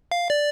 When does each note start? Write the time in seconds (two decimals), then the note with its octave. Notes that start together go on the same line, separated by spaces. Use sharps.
0.11 F5
0.30 D5